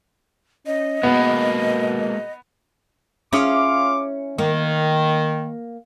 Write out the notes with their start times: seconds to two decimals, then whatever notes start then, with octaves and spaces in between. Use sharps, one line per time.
0.66 C#4 D#5
1.03 B2 G#3 A#3 B3
3.33 C#4 E4 F4 G#4 F5 D6
4.38 D#3 A#3